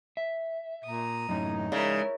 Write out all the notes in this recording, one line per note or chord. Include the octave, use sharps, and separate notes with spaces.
E5
A#2 A#5 D#6
F#2 A2 C#4 D#4
C#3 G#3 E4 A#4 D5